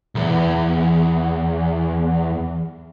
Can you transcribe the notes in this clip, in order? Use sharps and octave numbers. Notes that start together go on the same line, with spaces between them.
B1 E2